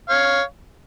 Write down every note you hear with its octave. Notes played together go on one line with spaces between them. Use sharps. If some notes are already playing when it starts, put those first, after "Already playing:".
C#5 F5